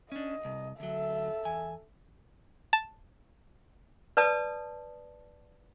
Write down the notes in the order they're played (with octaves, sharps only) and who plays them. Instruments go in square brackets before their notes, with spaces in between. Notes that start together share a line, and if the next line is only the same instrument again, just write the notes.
[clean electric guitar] C#4 D4 [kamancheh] D#5
[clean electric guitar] C2
[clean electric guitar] D2 F#3 [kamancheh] A4 E5
[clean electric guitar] E2 G#5
[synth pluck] A5
[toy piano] B4 D5 A5 D#6